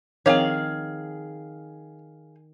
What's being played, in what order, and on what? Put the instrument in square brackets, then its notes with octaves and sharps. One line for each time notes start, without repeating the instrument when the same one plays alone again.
[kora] D#3 [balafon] F3 C4 G5 [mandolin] G#4 F5 [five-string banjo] C#5